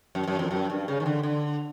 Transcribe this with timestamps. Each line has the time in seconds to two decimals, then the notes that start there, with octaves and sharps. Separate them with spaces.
0.15 F#2
0.27 F#2
0.39 F2
0.51 F#2
0.70 G2
0.88 C#3
1.00 D#3
1.06 D3
1.23 D3